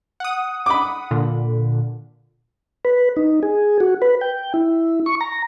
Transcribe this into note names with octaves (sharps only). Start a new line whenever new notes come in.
F#5 D#6
B5 D6
A#2 D3
B4
D#4
G#4
F#4
B4
G5
E4
C#6
A#5